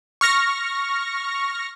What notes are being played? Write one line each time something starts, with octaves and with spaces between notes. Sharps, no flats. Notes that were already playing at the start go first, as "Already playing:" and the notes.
C#6 F6 A#6